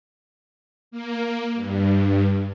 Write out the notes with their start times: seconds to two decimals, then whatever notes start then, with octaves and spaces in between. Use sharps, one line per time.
0.91 A#3
1.55 G2